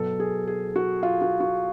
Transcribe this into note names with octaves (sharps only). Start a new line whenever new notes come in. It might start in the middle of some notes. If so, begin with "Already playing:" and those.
Already playing: B2 F#3 B3 A4
G#4
G#4
F#4
F4
F#4
F#4